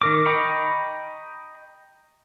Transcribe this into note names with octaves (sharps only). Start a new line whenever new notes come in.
D#3 A#4 D6
D#5 G5 A#5 B5 C#6